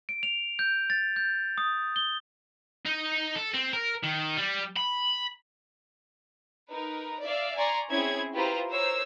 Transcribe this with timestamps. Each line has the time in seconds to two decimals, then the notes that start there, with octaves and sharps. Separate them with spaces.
0.09 D7
0.23 F7
0.59 G6
0.90 A6
1.16 G6
1.58 D#6
1.96 G7
2.85 D#4
3.35 A4
3.54 C4
3.73 A#4
4.03 D#3
4.37 G3
4.77 B5
6.71 D#4 A#4 B4
7.24 D5 E5 F5
7.58 D5 G#5 A#5 C6 C#6
7.89 C4 C#4 E4 G#4 G#6
8.34 E4 F4 G4 B4 C5 A#5
8.69 A#4 C5 C#5 E6